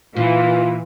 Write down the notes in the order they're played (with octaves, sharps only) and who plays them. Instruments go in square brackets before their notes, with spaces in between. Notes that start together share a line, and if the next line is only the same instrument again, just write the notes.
[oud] A#2 [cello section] E3 [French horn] F4